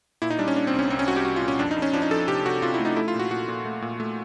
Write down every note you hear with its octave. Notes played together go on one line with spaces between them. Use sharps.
A#2 E4
D#4
G3 D4
C#4
A#2 D4
C4
C2
C#4
C2 C4
C#4
C2 F#4
G4
C2 F#4
F4
A#2
C#4
F2 D4
D#4
F2
C#4
F3 D4
D#4
F3 A4
C3 G4
C3 F#4
C3 F4
E4
A3
D#4
A3 E4
F4
A#2
F#4
A#2 F#4
A#2
A3
A#2
A3